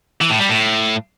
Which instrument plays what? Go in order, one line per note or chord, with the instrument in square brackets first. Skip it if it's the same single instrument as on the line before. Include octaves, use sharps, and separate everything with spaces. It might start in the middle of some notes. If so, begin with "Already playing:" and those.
[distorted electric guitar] E3
A2
G3
A2